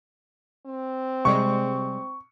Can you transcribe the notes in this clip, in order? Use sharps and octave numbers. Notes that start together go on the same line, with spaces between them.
C4
C3 G3 G#3 C#6